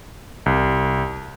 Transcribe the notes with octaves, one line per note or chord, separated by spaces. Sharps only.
C2